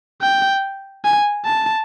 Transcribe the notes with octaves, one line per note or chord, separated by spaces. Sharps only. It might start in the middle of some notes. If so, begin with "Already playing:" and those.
G5
G#5
A5